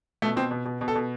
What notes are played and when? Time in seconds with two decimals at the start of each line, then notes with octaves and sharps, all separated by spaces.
0.22 B2 A3
0.36 B2 C4
0.51 B2
0.65 B2
0.81 B2
0.88 A4
0.95 B2